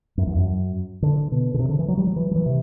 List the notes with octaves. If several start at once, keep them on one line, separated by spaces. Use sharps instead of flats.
F#2
E2
F#2
D3
B2
D3
C3
D3
E3
F#3
G3
F#3
E3
F#3
E3
C3